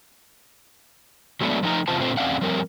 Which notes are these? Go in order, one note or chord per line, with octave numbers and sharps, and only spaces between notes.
F#3 G#3 A3 B3 D4
F3 A3 D#4 G5 A#5
E2 C3 F4 C5 A5
A#2 D3 A3 C4 F4 C5
E2 C4 C#4 D5 F5 F#5
F3 G3 C4 A#4 C#5